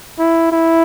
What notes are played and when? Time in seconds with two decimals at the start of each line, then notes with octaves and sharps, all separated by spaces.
0.19 E4
0.52 E4